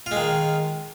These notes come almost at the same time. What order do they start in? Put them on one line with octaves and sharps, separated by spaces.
F4 G#3 D#3